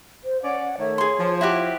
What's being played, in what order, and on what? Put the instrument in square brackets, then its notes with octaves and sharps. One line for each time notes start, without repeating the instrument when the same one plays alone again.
[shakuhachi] C5
[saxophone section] C#4 D5 [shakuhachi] F#5
[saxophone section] D#3 A3 [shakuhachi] C#5
[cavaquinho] G#4 C6
[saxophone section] F3
[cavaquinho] E4 F#4 G4